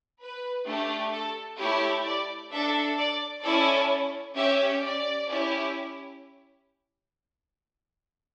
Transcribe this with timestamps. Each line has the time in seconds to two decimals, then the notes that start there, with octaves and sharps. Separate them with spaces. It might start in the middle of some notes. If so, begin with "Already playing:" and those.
0.21 B4
0.67 A3 D4 G4
1.13 A4
1.59 A3 E4 G4 C#5
2.05 D5
2.52 D4 A4 E5
2.98 D5
3.44 C#4 E4 A4 D5
4.36 C#4 G4 E5
4.82 D5
5.29 C#4 E4 G4